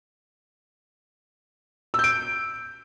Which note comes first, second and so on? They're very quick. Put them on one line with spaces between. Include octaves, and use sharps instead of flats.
E6 G6 D7